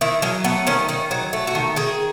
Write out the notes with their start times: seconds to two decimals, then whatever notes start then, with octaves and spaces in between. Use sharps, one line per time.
0.01 D#3 E4
0.22 F#3 C#4
0.44 A3 B3
0.67 D#3 C#4
0.89 D#3 D#4
1.11 F#3
1.33 A3
1.47 F#4
1.55 D#3
1.76 D#3 G#4